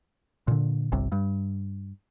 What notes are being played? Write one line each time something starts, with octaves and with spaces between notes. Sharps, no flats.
A#2 D3
G1 C2 C3
G2